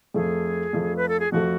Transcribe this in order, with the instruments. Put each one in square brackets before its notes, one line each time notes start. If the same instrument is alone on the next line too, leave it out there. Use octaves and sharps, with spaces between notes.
[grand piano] F2 F3 A3 [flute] G#4
[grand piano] F2 F3 A3
[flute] B4
A4
G#4
[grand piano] F2 F3 A3 [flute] F#4